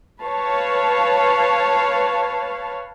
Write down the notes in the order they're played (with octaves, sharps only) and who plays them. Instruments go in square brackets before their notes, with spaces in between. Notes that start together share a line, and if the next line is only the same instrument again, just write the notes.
[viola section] B4 C#5 F5 A5